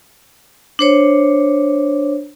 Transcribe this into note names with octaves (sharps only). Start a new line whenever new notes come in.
D4 C5 C#5